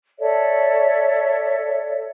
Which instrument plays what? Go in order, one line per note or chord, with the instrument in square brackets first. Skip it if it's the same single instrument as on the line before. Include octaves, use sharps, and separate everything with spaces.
[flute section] A4 C#5 D5 E5